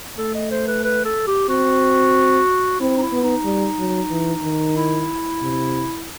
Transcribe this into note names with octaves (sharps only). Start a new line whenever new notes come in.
A3 A4
D#5
C5
B4
B4
A4
G4
C4 F#4
C4 E4
D#4
E4
B3
D#4
G3
F#3
E3
D#3
E4
C3